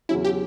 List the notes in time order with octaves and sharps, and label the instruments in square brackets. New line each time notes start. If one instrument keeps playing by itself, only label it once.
[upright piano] E2 C#3 F#3 C#4 [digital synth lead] E4
[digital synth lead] G4